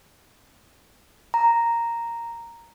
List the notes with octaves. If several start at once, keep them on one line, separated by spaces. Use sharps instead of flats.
A#5